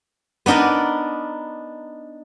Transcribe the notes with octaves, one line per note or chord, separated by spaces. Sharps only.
B3 D4 D#4 A#4 D5